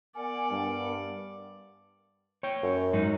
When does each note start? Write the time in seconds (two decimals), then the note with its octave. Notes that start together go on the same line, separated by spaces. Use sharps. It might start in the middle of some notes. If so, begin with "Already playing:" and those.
0.16 B3 A#4 D5 F#5 G#5
0.51 G2
2.43 C#5 G5
2.63 F#2
2.93 G#2 F#3 D#4